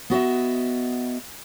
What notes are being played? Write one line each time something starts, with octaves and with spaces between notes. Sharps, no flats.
B3 F#4 D#5 E5